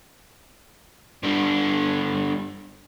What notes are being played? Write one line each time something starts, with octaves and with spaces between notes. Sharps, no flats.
G2 D3